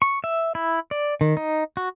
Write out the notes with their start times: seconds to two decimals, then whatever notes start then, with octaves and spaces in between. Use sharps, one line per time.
0.02 C#6
0.24 E5
0.55 E4
0.91 D5
1.21 D#3
1.37 D#4
1.77 F#4